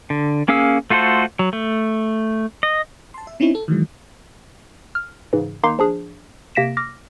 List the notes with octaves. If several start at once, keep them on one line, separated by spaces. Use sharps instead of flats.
D3
A#3 C#4 G#4 F5 E6
A3 F4 F#4 A4 C5
F#3
A3
D#5
A5 C6
E5
C4 C#4 D#4 E4 C#5
A4
D#3 E3 F#3 G#3
F6
G#2 C#3 E3
D#3 A#3 D#4 C6 D6 C7
F3 D4 G#4
C3 A#3 A#6 B6 D7 E7
D6 F6 A#6